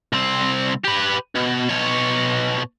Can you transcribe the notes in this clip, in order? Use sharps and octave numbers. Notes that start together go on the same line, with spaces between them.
C2 C4
G4 B4
B2
B2 C#5